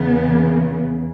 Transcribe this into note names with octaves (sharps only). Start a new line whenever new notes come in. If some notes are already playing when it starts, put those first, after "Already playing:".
Already playing: E2 C#3 E3 B3